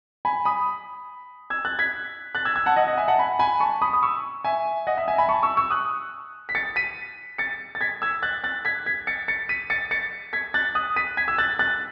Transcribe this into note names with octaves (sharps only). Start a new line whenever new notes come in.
G#5 B5
B5 D#6
E6 G#6
F#6 A6
G#6 B6
F#6 A6
E6 G#6
E6 G#6
F#5 A5
D#5 F#5
D#5 F#5
E5 G#5
F#5 A5
G#5 B5
G#5 B5
A5 C#6
B5 D#6
D#6
C#6 E6
E5 G#5
D#5 F#5
E5
E5 G#5
G#5 B5
A5 C#6
C#6 E6
C#6 E6
D#6 F#6
B6
A6 C#7
B6 D#7
A6 C#7
A6
G#6 B6
E6 G#6
F#6 A6
F#6 A6
G#6 B6
G#6 B6
A6 C#7
A6 C#7
B6 D#7
A6 C#7
A6 C#7
G#6 B6
F#6 A6
D#6 F#6
B6 D#7
G#6 B6
E6 G#6
F#6 A6
F#6 A6